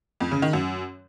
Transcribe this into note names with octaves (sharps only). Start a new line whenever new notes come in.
F2
C#3
D#3
F#2